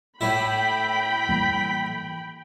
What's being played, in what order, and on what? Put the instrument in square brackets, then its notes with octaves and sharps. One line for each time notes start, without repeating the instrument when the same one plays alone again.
[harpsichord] A2 E4 [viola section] G5 B5 [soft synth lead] B6
[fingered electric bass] E3 G3 A#3